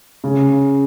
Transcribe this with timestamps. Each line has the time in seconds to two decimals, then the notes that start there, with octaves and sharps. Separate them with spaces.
0.24 C#3